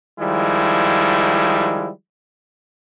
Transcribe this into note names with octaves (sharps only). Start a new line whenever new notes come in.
D#3 F3 G3 G#3 E4